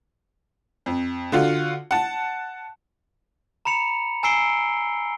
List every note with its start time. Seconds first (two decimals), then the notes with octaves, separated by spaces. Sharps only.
0.86 F2
1.32 D3 F4 F#4
1.91 F#5 A5
3.65 A#5 B5 C#7 F7
4.23 G#5 A#5 E6 C7 D7 G7